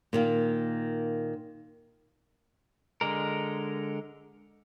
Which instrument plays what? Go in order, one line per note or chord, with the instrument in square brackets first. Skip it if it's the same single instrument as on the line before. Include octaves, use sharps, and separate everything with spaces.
[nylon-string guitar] A#2 D#3 A#3
[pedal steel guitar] D3 G#3 A#4